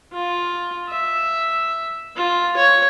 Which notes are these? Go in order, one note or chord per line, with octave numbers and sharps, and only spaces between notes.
F4
E5
F4
C#5